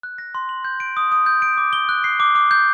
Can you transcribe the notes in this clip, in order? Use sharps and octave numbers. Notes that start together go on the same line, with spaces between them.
F#6
A#6
C6
F#7
G6
D7
D#6
D#6
G6
D7
D6
G7
F#6
C7
D6
D6
G6